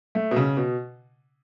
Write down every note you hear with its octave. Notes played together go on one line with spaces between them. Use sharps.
A3
B2
C#3
B2